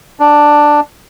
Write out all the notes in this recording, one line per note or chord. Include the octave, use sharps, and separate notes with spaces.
D4